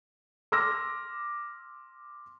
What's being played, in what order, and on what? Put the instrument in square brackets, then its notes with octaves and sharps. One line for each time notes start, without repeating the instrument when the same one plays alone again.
[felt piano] C6 D6 E6 F6 A#6